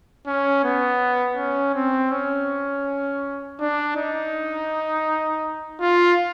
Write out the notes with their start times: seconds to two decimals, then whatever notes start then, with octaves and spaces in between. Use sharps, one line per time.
0.27 C#4
0.64 B3
1.37 C#4
1.75 C4
2.12 C#4
3.60 D4
3.97 D#4
5.81 F4